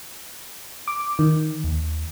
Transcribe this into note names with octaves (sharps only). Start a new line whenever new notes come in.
D6
D#3
D#2